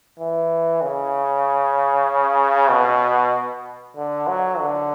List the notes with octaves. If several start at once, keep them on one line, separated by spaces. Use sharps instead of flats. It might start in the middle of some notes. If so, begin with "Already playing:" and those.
E3
C#3
B2
D3
F#3
D3